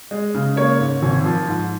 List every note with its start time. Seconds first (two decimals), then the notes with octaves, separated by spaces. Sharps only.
0.11 G#3
0.34 C#3
0.56 A#3 C#5
0.79 G#2
1.02 G#1
1.25 F3
1.47 G#2